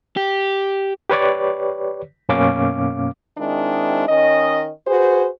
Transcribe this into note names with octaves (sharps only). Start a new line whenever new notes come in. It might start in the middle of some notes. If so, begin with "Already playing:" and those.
G4
G4 B4 C#5 D5
F#2 B2 A#3 C#4 F5 D6
D#3 G#3 C4 D4 E4
D#3 C#4 D#5
F#4 G#4 B4 C5